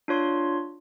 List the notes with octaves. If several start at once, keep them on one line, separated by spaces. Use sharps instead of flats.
D4 F4 C#5 C6